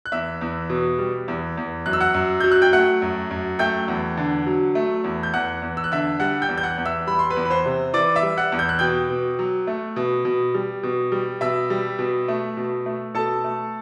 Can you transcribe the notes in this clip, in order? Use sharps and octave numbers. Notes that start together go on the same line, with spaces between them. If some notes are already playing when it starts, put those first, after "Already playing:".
F#6
E2 E5 E6
E2
B2
G3
E2
E2
F#2 F#6
E6
F#5 F#6
F#2
F#3 G6
F#6
G5 G6
A3 F#5 F#6
F#2
F#2
A3 G5 G6
E2
D3
F#3
A3
E2
G6
E2 F#5 F#6
E2
E6
F#6
D3 E5 E6
G3 F#5 F#6
G5 G6
E2
G6
F#5 F#6
E2
E5 E6
G3 B5
C6
B4 B5
E2
B5
C5 C6
C3
E3 D5 D6
E5 E6
G3
F#5 F#6
E2
G6
F#6
B2 G5 G6
B2
F#3
A3
B2
B2
G3
B2
G3
B2 E5 E6
G3
B2
A3
B2
A3
B2 A4 A5
A3